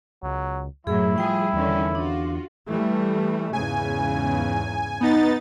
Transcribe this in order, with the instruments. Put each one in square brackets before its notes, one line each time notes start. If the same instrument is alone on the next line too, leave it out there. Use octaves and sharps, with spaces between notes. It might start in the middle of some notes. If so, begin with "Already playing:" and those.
[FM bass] C#2 [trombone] F#3
[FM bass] F#2 [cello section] A2 F#3 [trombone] E4 [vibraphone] G#4
[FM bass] F3 [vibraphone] G3 G5 [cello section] G#4
[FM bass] E2 [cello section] D3 D#3 C#4
[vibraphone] D4 [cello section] F4 F#4
[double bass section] E3 G3 A3
[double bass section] E2 G#2 C#3 [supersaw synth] G#5
[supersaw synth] B3 D#4 A6